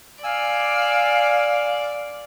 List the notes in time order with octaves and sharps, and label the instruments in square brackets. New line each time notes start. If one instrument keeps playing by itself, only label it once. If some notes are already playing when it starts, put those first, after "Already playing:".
[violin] D5 [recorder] F5 [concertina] G#5 E6